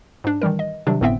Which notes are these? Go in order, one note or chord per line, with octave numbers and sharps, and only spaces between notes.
G#2 D4
D#3 E3 G3 A#4
D#5
C3 D#3 F#3 G3 D4
G1 A2 B3 C4 E5 G5